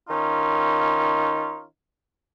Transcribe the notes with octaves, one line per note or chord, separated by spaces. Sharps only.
D#3 C#4 D#4 F4